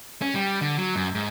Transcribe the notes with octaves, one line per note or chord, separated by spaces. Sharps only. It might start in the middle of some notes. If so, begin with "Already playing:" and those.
C#4
G3
D3
F#3
F#2
G#2